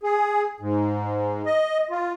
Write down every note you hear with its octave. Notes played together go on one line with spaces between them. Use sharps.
G#4
G#2
D#5
F4